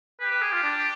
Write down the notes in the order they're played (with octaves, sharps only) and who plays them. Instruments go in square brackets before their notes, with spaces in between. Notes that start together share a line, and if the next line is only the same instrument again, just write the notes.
[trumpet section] G4 [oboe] B4
[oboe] B4
G#4
F4
D4